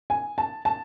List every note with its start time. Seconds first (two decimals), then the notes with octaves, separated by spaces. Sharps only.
0.10 G#5
0.38 A5
0.65 A5